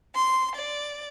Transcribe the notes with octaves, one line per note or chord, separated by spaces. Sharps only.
C6
D5